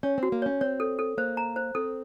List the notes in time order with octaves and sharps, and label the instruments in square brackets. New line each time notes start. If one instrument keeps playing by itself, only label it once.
[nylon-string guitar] C#4 [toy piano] C#5
[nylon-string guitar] C4 [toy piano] F#4
[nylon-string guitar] A#3
[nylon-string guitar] C#4 [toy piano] C#5
[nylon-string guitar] C4 [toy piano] C#5
[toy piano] A4
A4
[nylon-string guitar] A#3 [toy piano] C5
[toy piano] A#5
C5
[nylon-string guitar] C4 [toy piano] A4